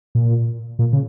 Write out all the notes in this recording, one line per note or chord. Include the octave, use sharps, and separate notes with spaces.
A#2
A#2
C#3